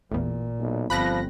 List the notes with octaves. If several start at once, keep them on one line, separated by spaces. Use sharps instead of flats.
A1 E2 A#2
B1
G1 F3 C4 B5 F#6 A#6